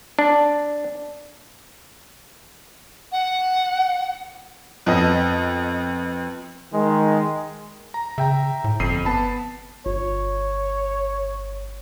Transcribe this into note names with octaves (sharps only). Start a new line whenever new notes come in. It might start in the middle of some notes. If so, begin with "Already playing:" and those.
D4
F#5
F2 B3 D#5
D#3 G#3
A#5
C#3 E5 G5 A#5
A2
G1 F2 C7 D#7
B3 A5 B5
G1 C#5